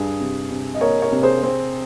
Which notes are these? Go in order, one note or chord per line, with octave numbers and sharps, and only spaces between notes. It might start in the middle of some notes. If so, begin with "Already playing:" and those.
Already playing: G2 G#4
C3
C3
D#5
A#3 A#4 C#5
A#4 C#5
C3
G#4 C5
C4